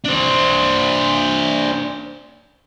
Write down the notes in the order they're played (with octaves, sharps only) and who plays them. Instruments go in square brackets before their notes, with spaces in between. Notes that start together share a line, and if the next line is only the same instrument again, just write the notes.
[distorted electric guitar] D4 C5